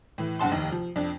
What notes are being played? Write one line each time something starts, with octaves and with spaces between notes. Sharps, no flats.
A2 E3
F#1 G2 F#5 A5 C6
F1 D#2 D#3
F3
F2 D4